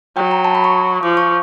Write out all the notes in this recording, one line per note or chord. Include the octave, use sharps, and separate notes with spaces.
F#3 G5
A#5
A5
B5
C#6
F3 D6
C#6